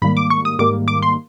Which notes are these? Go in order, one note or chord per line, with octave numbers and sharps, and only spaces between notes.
G#2 D#3 G3 A#3 B5
D6
C#6
D#6
G#2 D#3 G3 A#3 D6
D6
C6